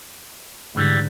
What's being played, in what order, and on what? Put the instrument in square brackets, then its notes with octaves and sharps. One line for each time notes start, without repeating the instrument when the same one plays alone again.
[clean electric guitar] C#2 E3 G3 [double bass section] G#2 D3